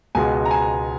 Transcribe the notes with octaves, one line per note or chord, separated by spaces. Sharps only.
C#2 B2 G#3 B3 G#5
A#5
G#5